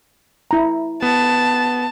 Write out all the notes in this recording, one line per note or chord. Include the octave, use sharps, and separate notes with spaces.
E4 A#5
B3 A5